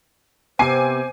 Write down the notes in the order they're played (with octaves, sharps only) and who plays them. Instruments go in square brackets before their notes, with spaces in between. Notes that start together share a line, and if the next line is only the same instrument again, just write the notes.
[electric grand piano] C3 B3 C4 [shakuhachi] C5 [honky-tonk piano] G#5 D6 C7